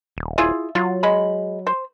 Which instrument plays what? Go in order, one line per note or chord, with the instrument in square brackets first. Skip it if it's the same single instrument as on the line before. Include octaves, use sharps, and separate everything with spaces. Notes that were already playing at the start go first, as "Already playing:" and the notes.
[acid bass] D#1
[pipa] E4 F4 G#4
[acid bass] F#3 [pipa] F4
[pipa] G#3 B5
C5